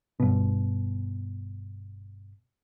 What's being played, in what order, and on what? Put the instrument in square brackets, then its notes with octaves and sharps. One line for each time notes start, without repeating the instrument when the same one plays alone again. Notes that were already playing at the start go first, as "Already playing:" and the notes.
[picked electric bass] G1 B2